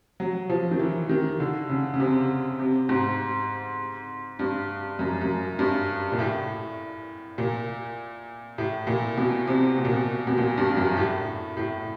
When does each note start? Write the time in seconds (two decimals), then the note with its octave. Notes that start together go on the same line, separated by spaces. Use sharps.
0.20 F#3
0.49 F3
0.71 D#3
0.79 E3
1.09 D#3
1.40 D3
1.69 C#3
1.94 C#3
2.00 C3
2.59 C3
2.89 G#2
4.39 G2
4.99 F#2
5.21 F#2
5.59 G2
6.12 A#2
6.19 A2
7.38 A#2
8.58 A2
8.87 A#2
9.18 B2
9.47 C3
9.78 B2
9.85 A#2
9.92 B2
10.27 B2
10.37 A#2
10.58 G2
10.77 F#2
10.97 A2
11.57 A2